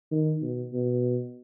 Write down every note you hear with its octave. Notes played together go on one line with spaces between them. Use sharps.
D#3
B2
B2